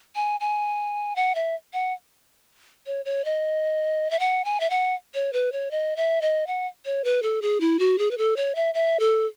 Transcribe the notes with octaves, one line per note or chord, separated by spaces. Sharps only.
G#5
G#5
F#5
E5
F#5
C#5
C#5
D#5
E5
F#5
G#5
E5
F#5
C#5
B4
C#5
D#5
E5
D#5
F#5
C#5
B4
A4
G#4
E4
F#4
G#4
B4
A4
C#5
E5
E5
A4